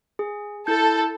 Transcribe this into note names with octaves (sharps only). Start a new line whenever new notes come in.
G#4
E4 A4 G6